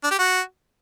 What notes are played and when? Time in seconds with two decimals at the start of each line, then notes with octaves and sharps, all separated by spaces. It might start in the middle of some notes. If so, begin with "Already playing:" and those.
0.04 D4
0.11 G4
0.19 F#4